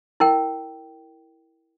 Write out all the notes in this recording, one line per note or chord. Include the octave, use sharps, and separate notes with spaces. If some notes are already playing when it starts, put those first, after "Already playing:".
E4 A#4 G5